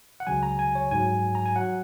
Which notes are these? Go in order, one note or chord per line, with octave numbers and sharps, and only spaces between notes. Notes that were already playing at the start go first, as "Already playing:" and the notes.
F#5
C#2 C#3 F#3 G#5
A#5
G#5
C#5
G#2 F#3 G#5
A#5
G#5
F#3 F#5